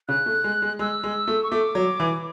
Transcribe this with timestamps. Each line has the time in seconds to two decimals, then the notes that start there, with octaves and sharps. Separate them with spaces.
0.09 C#3 F#6
0.26 A3
0.44 G#3
0.62 G#3
0.79 G#3 E6
1.04 G#3
1.28 A3
1.43 C#6
1.51 A3 D6
1.75 F#3
2.00 E3